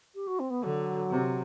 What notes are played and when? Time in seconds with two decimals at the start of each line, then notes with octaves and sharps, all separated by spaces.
0.15 G4
0.27 F#4
0.39 C4
0.50 B3
0.63 D3 F#3
1.10 C3